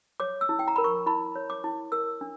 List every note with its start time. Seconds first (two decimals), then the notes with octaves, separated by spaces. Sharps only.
0.20 C#5 D6
0.41 E6
0.49 E4
0.59 G5
0.68 A#5
0.76 A#4 B5
0.84 C#6
1.07 E4 B5
1.36 C#5
1.50 D6
1.64 E4
1.92 A#4 E6
2.21 D4